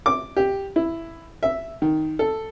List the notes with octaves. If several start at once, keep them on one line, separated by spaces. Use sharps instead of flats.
D6
G4
E4
E5
D#3
A4